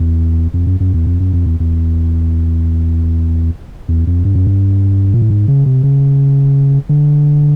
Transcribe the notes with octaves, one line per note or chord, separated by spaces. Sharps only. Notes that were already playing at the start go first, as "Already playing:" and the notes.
Already playing: E2
F2
F#2
F#2
E2
F2
F#2
F2
E2
E2
E2
F2
G2
F#2
G2
A#2
A2
G#2
C#3
C3
C#3
D3